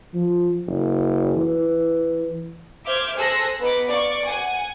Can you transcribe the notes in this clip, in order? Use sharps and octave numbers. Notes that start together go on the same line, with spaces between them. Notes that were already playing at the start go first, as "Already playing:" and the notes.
F3
F#1
E3
C5 E5 D6 F6 G6 G#6
G#4 A4 C5 E6 F#6 A#6
B3 D#4 B5 D6
D5 F5 C#6 D6
F#5 G#5